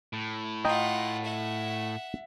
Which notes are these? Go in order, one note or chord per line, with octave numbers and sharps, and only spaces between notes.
A2
F4 D#5 F#5 G5 A#5
E5 F#5